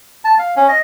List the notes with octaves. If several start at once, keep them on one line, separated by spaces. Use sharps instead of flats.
A5
F5
C#4
D#5